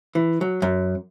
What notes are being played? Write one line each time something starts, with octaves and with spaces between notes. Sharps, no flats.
E3
F#3
F#2